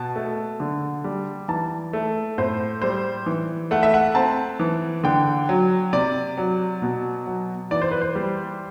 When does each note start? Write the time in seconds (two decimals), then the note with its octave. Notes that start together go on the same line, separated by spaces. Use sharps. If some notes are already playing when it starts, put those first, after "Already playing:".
Already playing: B2 A5
0.16 A3
0.60 D3
1.04 G3
1.48 E3 A5
1.93 A3
2.38 A2 C5
2.82 G3 C5
3.26 E3
3.71 A3 F#5
3.83 E5
3.94 F#5
4.15 C4 A5
4.60 E3
5.04 D3 G5
5.49 F#3
5.93 C3 D5
6.38 F#3
6.82 B2
7.27 F#3
7.71 E3 D5
7.81 C5
7.91 B4
8.01 C5
8.15 G3